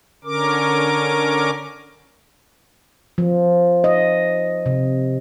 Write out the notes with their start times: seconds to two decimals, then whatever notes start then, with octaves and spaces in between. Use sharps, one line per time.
0.24 D3 C#4 A#4 D6
3.18 F3
3.84 D#5
4.66 C3